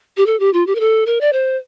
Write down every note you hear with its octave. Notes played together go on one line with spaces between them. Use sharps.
G4
A4
G4
F4
G4
A#4
A4
A#4
D5
C5